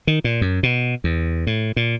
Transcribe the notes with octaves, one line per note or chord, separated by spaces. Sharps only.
D#3
A#2
F#2
B2
E2
A2
A#2